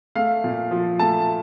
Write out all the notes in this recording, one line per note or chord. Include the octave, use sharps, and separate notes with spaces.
A3 F5
A#2
F3
A3 A5